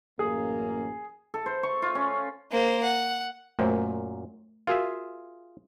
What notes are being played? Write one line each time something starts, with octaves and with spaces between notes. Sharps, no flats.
A1 F#2 A#3 G#4
A4
C5
C#6
F4
C#4
A#3 C5
F#5
F#2 A#2 A3 A#4 C5
F4 F#4 G#4 A#4 E5 F5